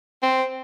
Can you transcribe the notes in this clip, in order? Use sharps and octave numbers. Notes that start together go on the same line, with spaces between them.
C4